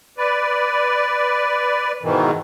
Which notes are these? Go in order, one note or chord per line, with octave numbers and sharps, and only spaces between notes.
B4 D5
G#2 B2 D#3 E3